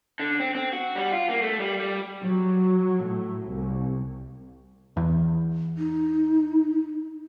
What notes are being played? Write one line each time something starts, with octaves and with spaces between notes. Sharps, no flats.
D3
C4
C4
F#4
G3
F4
A#3
A3
G3
G3
F#3
A2
C2
E2
D#4